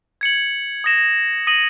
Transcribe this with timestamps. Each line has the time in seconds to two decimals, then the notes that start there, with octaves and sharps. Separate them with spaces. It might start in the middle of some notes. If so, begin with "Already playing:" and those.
0.21 G#6 C#7 F#7
0.84 D#6 A#6 E7
1.47 D#6 A#6 D#7 F#7